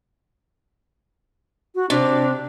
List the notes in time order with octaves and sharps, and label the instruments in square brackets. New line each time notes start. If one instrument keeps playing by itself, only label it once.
[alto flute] F#4
[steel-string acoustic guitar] C3 [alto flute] D4